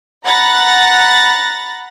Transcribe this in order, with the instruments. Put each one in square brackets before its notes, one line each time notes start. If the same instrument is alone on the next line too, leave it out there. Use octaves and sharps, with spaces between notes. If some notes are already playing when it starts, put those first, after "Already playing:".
[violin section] F#5 A#5 B5 F#6 A6 A#6